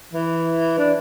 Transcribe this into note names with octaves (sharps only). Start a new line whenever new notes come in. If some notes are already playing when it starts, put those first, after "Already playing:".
E3
D4